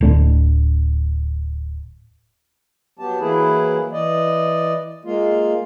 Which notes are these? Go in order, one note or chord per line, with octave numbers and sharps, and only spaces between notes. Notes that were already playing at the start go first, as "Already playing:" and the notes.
D1 A3 D4
F#3 B3 G4 A5
E3 F#3 A#3 E4 G#4 B4
E3 D5 D#5
G#3 A#3 F4